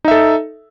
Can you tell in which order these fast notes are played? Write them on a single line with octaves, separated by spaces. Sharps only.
D#4 E5 A4